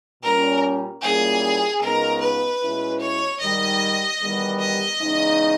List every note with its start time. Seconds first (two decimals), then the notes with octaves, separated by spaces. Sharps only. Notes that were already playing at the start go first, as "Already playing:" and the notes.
0.23 A#2 G3 C#4 A#4
1.02 A#2 G3 A#3 C#4 E4 G#4
1.81 C#2 C#3 G#3 B3 D#4 A#4
2.21 B4
2.62 B2 G#3 C#4 E4
3.00 C#5
3.40 G#2 D#3 G3 D#5
4.19 E2 D#3 G3 B3
4.60 D#5
4.99 E2 C#3 G#3 D#4